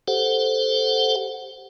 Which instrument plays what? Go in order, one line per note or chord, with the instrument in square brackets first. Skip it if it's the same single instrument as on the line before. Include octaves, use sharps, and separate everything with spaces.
[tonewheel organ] G4 A4 C5 F#5